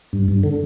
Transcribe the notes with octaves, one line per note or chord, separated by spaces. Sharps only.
G2
G2
D3